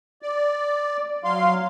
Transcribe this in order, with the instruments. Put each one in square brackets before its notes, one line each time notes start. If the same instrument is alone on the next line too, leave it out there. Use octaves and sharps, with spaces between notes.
[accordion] D5
F#3 F5 C6